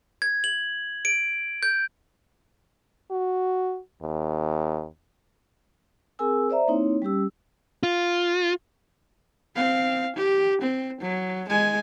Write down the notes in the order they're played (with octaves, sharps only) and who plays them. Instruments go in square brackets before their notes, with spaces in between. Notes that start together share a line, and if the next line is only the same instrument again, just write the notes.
[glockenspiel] G#6
F#7
D7
G6
[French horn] F#4
D#2
[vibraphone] C4 G#4 A#4 G#5 E6
C5 D5 E5 A#5
A#3 C4 D#4 E4 C#5
G3 C#4 G4 E6
[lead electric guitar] F4
[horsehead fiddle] C4 F5
G4
C4
F#3
G#3 G#5